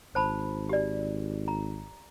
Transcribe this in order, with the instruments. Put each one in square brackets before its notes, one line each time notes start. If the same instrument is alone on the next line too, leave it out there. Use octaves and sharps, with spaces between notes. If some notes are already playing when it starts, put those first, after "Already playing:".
[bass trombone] G#1 [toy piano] C5 A5 B5
[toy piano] G4 D5
A#5